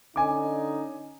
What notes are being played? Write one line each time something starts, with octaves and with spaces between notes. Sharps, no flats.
D3 C#4 D#4 G#5 D6